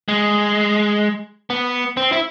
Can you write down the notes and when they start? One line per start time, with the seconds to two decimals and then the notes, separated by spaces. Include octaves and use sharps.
0.08 G#3
1.50 B3
1.97 C4
2.12 E4